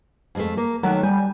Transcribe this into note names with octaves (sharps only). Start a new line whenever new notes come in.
F2 G#3 A3
A#3
D#3 F#3 A3
G3 G#5